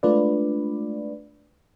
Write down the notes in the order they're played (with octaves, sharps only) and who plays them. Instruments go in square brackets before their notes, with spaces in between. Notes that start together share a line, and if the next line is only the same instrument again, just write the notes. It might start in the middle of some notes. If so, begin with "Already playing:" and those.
[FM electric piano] G#3 A3 D4 F4 B4 D5